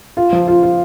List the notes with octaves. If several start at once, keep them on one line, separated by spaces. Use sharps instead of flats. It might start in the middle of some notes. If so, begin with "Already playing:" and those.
F4
F3
F4
F4